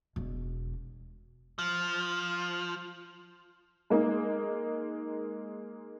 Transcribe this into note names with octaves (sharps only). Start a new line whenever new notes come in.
E1 B2
F3
G#3 A#3 D#4